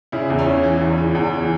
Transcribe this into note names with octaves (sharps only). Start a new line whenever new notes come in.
C#3 E4
E2
C#4
E3
E3
E2
E3
E2
E3